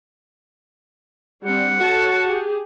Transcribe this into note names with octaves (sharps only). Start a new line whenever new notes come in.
G3 C4 D4 F#5
F#4 A4 C#5 A5
G4 G#4